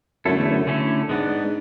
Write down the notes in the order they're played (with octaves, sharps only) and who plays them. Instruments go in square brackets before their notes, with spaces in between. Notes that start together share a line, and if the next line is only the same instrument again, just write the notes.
[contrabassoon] F#2 [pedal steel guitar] D3 A3 C#4 E4 A4
[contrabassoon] E2
F#2
[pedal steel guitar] D3 A3 C#4 E4 A4
[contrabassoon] G#2 [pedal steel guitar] G#3 B3 D4